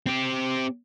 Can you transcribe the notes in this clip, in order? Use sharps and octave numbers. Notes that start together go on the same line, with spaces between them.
C4 G4